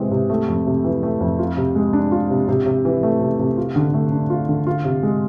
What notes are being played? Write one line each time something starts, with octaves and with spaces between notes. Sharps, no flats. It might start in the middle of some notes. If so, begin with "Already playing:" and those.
Already playing: C3 E3 G#3 C4
C3
A3
F2
C3
E3
A3
F2
F4
C3
G#3
D4
F4
C3
C3
C3
E3
A3
C3
C3
F4
D3
A3
D4
F4
D3
F4
C3
G#3